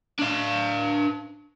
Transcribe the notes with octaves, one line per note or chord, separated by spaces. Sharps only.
D4 F5